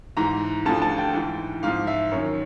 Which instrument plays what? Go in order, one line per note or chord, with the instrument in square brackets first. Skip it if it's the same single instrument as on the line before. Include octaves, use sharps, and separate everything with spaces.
[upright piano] G#2 E3 A#5
D2 D3 F3 A5
A5
G5
G#2 E3
G#2 F3 F5
E5
F#2 D#3 C#5